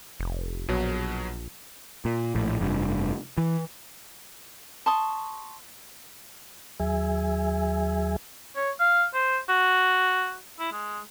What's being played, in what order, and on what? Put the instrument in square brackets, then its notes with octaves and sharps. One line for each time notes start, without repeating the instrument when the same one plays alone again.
[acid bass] F1
[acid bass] A#1 [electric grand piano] B2 F#3
[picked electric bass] A#2
A#1 A2
F1 G2
E3
[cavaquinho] A5 C6 C#6 D#6
[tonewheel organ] D#2 F#3 G#4 E5 G#5
[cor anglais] C#5
F5
C5
F#4
E4
G#3